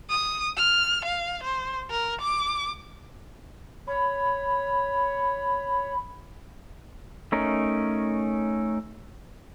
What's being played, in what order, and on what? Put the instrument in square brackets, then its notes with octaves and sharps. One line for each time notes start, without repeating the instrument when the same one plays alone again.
[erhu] D#6
F6
F5
C5
A#4
D6
[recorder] C#5 [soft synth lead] B5
[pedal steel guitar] A3 C#4 D#4 A#4